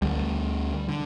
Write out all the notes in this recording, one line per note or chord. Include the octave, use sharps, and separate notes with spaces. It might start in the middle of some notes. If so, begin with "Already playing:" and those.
D2 D3 G3
D3